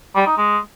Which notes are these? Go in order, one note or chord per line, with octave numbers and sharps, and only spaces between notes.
G3
D#4
G#3